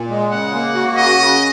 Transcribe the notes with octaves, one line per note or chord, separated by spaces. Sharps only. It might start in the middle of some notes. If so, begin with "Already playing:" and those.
Already playing: A#2
G#3
C#3 F#5
A#3
F#4
C#3 D#5
C#3